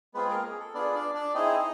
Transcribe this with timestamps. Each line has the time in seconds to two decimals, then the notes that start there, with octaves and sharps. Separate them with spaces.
0.14 G#3 B3 C4 F4 G#4 B4
0.29 A#3 A#4
0.44 G#4
0.59 A4
0.74 B3 D4 F4 G#4 D5
0.94 D4 D5
1.14 D4 D5
1.34 C4 D#4 E4 G#4 D#5